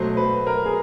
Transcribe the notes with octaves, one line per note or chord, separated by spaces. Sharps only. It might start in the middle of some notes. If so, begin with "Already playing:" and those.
Already playing: B2 F#3 A3 C5
B4
A#4
G#4